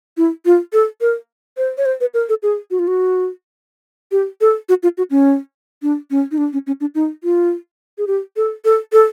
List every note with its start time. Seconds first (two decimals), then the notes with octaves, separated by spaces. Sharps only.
0.17 E4
0.45 F4
0.73 A4
1.01 A#4
1.57 C5
1.78 C#5
1.86 C5
2.01 B4
2.14 A#4
2.29 A4
2.43 G#4
2.71 F#4
2.79 F4
2.87 F#4
4.12 G4
4.41 A4
4.69 F#4
4.83 F4
4.98 F#4
5.11 C#4
5.82 D4
6.11 C#4
6.31 D#4
6.38 D4
6.53 C#4
6.67 C#4
6.81 D4
6.95 D#4
7.24 F4
7.98 G#4
8.07 G4
8.36 A4
8.65 A4
8.92 A4